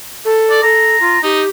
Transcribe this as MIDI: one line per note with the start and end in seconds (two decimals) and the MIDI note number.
0.25 0.60 69
0.50 0.59 74
0.63 0.98 69
0.63 1.18 82
1.00 1.18 65
1.23 1.42 63
1.23 1.48 67